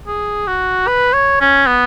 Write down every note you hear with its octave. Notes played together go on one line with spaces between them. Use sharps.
G#4
F#4
B4
C#5
C#4
B3